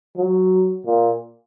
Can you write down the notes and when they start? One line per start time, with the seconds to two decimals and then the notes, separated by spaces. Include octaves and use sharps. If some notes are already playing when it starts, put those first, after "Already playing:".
0.17 F#3
0.86 A#2